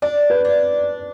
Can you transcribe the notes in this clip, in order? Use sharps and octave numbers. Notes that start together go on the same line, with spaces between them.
D4 D5
B4
D4